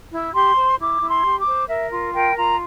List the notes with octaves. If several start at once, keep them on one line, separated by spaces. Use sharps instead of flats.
E4
G4 C6
C5
E4 D6
E4
C6
G4
D6
C5
A#4 E5
F4
A#4 G5
F4 A#5